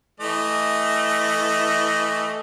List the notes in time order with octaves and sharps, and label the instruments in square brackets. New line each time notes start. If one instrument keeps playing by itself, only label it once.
[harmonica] E3 A3 D#5